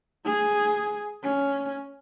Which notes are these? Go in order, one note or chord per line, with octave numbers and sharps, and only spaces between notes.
G#4
C#4